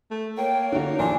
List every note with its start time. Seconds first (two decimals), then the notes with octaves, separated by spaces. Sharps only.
0.11 A3
0.37 A#3 C#5 G5
0.72 D3 D#4 F#4
0.99 A#1 E2 D4 G#5 C6